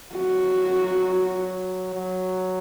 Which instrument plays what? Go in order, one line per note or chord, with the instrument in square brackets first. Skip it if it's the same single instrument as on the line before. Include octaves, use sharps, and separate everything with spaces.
[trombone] F#3 [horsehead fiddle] F#4
[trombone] F#3